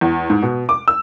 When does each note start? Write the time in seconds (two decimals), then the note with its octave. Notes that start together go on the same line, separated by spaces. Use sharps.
0.01 E2
0.30 G#2
0.43 B2
0.69 D6
0.88 E6